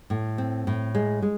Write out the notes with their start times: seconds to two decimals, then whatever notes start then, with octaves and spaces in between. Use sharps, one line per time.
0.10 A2
0.38 C4
0.67 A2
0.95 G#3
1.22 G#3